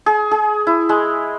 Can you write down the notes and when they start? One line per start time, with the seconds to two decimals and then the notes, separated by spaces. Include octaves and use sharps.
0.06 G#4
0.31 G#4
0.67 E4
0.89 G#3